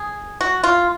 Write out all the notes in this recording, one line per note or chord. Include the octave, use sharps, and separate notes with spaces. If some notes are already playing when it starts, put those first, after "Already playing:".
Already playing: G#4
F#4
F4